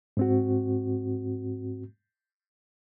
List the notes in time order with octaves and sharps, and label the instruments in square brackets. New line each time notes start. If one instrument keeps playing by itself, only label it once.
[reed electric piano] G#2 C4 F#4